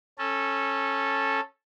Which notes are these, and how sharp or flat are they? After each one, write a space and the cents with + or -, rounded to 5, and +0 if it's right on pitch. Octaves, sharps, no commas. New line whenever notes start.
C#4 -15 A4 -5